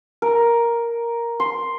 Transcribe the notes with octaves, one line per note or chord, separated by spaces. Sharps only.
A#4
C6